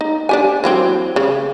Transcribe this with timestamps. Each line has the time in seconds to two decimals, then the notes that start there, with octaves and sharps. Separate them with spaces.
0.01 D#4
0.29 D4 G4 G#5
0.64 E3 F#3 C4
1.16 C#3